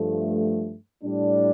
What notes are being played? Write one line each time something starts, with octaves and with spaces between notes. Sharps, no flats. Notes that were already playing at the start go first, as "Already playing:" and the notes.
Already playing: G2 F3 A3
A2 G3 D4